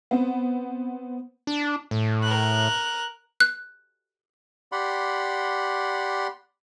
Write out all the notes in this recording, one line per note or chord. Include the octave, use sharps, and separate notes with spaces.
B3 C4
D4
A2
A#4 F#6
F#6
G4 D5 F#5 B5 C6